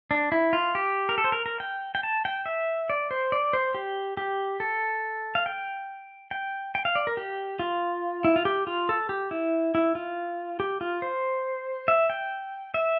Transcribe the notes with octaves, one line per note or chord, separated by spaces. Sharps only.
D4
E4
F4
G4
A#4
A4
C5
A#4
A#4
G5
G5
A5
G5
E5
D5
C5
D5
C5
G4
G4
A4
F5
G5
G5
G5
F5
D5
A#4
G4
F4
E4
F4
G4
F4
A4
G4
E4
E4
F4
G4
F4
C5
E5
G5
E5